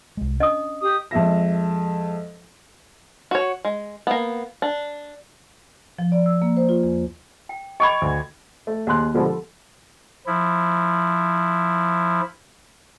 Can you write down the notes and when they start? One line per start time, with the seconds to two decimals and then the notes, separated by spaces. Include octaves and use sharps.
0.17 C2 G#3
0.40 C#4 D4 D#5 D#6
0.82 G4 D#6
1.11 F2 G#3 E5 A#6
3.31 F#4 C#5
3.65 G#3
4.07 A#3 B3
4.62 D4
5.98 F3
6.12 D5
6.26 E6
6.42 A#3
6.57 C5
6.69 F4
6.83 E2
7.49 G5
7.80 D#5 G5 B5 C#6 D6 G#6
8.02 D2
8.67 A3
8.87 D#2 G#4 C6 F#6
9.14 B2 D3 F3 G3 G#3 A4
9.25 A4
10.26 F3 E4